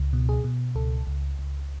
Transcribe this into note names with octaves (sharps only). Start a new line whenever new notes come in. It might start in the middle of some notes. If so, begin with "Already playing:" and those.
Already playing: C#2
B2
G#4
B2
C#2 A4
C#2
C#2